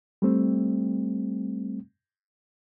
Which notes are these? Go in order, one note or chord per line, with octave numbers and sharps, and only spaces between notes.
G3 A3 C4